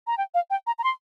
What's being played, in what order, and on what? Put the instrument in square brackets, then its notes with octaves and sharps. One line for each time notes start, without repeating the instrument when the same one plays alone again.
[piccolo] A#5
G5
F5
G5
A#5
A#5
C6